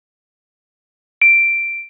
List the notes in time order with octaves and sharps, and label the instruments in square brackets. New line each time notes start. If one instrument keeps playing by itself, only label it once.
[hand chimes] D7